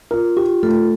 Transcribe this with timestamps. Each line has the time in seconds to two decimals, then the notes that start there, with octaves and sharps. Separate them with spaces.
0.11 F4 A#4
0.37 F4 G4
0.63 A3 F4 A4